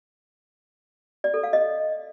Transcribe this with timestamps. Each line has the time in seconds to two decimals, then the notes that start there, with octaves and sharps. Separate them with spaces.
1.24 D5
1.34 A4
1.43 F5
1.53 D#5